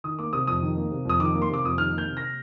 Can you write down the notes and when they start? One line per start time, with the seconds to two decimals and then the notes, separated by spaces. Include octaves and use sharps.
0.04 D#3 D#6
0.19 A#3 D6
0.33 C3 D#6
0.47 F2 D#6
0.62 D#3
0.77 A#3
0.91 C3
1.05 F2 D#6
1.19 D#3 D6
1.35 A#3
1.42 C6
1.49 C3 D6
1.64 F2 D#6
1.77 D#3 F6
1.92 A#3
1.98 G6
2.07 C3
2.17 A#6